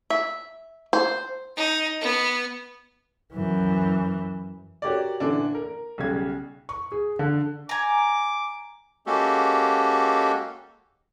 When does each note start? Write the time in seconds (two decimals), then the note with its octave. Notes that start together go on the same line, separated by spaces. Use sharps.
0.10 E5
0.93 C5
1.56 D#4
2.01 B3
3.34 F#2 E3
4.82 F#4 G4 A#4 C#5 D5
5.20 A#2 D3 E3 D4
5.55 A#4
5.98 B1 C#3 G3 G#6
6.69 C#6
6.92 G#4
7.19 D3
7.69 G#5 A#5 D6
9.07 G#3 A#3 C#4 F#4 G4 A4